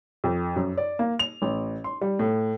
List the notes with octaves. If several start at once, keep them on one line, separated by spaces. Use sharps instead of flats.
F2
F#2
D5
A#3
F7
A1
C6
G3
A2